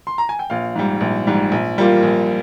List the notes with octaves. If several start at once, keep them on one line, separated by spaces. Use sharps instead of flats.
C6
A#5
G#5
G5
A#1 F5
G#2 G3
A#1
G#2 G3
A#1
A#2 G3 A#3 F4
A#1